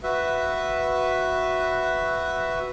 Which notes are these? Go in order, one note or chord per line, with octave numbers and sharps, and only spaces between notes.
F#4 B4 E5